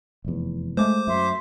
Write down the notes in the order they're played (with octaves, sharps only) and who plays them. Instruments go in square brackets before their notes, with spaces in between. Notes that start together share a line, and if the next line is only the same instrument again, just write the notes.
[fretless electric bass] F1 E2
[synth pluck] G#3 A3 [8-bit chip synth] C5 D6
[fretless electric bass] F#2 [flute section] E5 C6